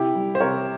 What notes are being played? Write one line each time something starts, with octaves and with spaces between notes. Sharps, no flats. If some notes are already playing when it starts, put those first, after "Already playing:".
Already playing: C3 E4 G4
G3
C5
C3 A#4 C#5